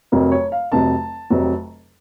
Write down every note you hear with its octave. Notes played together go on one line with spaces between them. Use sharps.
F1 F2 C3 F#3 A#4
C#5
F5
F1 F2 C3 F#3 A5
F1 F2 C3 F#3